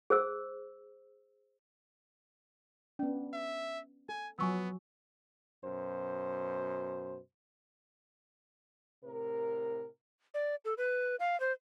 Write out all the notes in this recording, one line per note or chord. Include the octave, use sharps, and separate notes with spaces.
G#4 C5 E6
B3 C#4 D4
E5
A4 G#5
F3 F#3 B3 G#5 C#6 E6
F#2 B2 C5
A2 C3 A#4
D5
A4
B4
F5
C5